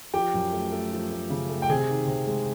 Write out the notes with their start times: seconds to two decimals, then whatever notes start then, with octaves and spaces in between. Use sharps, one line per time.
0.14 F3 G4 G5
0.34 F#2
0.53 A3
0.72 A3
0.92 F3
1.11 A3
1.30 C#3
1.49 A3
1.62 G5
1.69 C3 G#4 G#5
1.89 D#3
2.08 C3
2.27 G#3